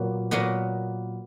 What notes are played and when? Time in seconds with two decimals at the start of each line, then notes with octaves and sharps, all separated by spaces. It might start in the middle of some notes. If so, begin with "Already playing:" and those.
Already playing: A#2 F#3 B3
0.31 A#2 F#3 B3 D#5